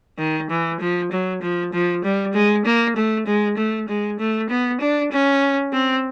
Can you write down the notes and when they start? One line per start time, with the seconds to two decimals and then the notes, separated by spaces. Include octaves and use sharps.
0.18 D#3
0.50 E3
0.80 F3
1.11 F#3
1.42 F3
1.73 F3
2.04 G3
2.34 G#3
2.65 A#3
2.96 A3
3.26 G#3
3.57 A3
3.88 G#3
4.19 A3
4.49 B3
4.80 D4
5.12 C#4
5.73 C4